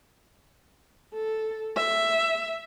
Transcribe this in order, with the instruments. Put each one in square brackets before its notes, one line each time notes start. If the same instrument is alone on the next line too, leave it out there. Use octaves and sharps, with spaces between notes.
[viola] A4
E5